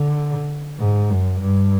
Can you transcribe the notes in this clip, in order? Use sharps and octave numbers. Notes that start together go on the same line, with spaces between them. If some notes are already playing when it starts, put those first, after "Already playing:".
Already playing: D3
G#2
F#2
G2